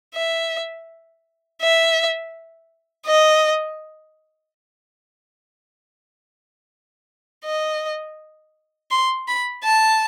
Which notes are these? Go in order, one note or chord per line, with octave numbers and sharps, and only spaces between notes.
E5
E5
D#5
D#5
C6
B5
A5